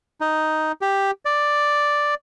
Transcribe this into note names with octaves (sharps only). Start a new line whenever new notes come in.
D#4
G4
D5